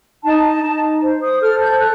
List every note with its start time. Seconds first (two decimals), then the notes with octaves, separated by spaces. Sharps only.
0.24 D#4 A5
0.62 D#4
1.01 C5
1.22 D#6
1.40 A4 F6
1.60 G6
1.80 F#6